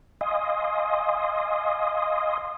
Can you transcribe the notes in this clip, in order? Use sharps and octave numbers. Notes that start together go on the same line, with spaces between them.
D#5 F5 G#5 C6 D#6